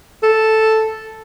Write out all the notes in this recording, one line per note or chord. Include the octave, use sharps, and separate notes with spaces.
A4